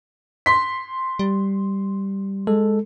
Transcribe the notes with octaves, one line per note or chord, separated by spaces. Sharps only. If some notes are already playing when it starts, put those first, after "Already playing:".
C6 B6
G3
G#3 A4